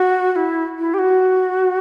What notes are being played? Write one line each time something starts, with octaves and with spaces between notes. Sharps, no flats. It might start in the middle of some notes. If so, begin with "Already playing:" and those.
Already playing: F#4
F#4
E4
E4
G4
F#4